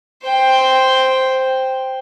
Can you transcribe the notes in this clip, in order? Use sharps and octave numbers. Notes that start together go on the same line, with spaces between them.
C5 G5